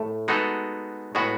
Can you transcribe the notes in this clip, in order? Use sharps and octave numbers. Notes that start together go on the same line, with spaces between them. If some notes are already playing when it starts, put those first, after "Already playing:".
Already playing: A2 A3
G#3 B3 D#4 F#4 A4
A2 G#3 B3 F#4